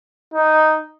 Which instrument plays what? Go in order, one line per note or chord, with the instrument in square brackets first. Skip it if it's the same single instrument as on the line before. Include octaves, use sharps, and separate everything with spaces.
[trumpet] D#4